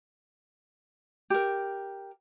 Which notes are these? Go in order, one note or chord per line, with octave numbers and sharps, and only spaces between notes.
G4 A#4